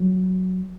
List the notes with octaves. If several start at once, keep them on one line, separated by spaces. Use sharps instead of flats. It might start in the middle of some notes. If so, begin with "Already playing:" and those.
Already playing: F#3